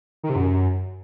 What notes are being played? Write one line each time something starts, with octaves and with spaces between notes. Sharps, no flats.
D#3
C3
F#2